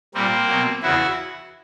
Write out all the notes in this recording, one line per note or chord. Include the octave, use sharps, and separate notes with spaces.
A#2 G3 A#3 C4
B2 F#3
E2 C#3 E3 E4 F#4